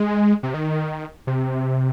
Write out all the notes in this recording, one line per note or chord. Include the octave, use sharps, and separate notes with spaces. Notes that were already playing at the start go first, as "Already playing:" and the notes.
Already playing: G#3
C3
D#3
C3